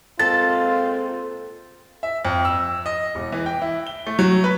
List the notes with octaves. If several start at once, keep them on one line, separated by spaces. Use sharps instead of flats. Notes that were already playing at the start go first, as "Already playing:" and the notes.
A#2 G#3 C4 F4 A4 A6
E5
F2
E6
D#5
E1
E3
G5
E4
G7
A3
F#3
B4